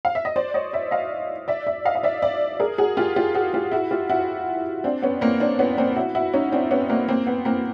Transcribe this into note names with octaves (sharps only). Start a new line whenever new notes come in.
F5
E5
D#5
C5 D5
C#5 D#5
D5 E5
D#5 F5
D5 E5
D5 E5
D#5 F5
F5
D5 E5
D5 E5
G#4 A#4
F#4 G#4
F4 G4
F4 G4
F#4 G#4
F4 G4
E4 F#4
F4 G4
E4 F#4
C4 D4
B3 C#4
A#3 C4
C4 D4
B3 C#4
A#3 C4
E4 F#4
E4 F#4
C#4 D#4
C4 D4
B3 C#4
A#3 C4
A#3 C4
B3
A#3 C4